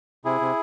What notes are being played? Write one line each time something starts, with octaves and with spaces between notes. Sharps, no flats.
C3 E4 G#4
C3